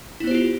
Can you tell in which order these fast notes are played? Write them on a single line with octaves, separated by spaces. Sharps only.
E4 B3 C5 G4 F4